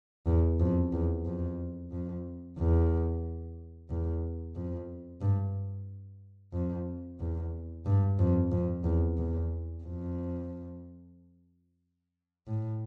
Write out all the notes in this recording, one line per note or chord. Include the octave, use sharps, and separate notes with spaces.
E2
F2
E2
F2
F2
E2
E2
F2
G2
F2
E2
G2
F2
F2
E2
E2
F2
A2